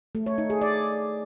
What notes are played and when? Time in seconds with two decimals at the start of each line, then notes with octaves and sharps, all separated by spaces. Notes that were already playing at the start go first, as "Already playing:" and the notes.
0.15 A3
0.26 C#5
0.38 D#4
0.50 G#4
0.62 D5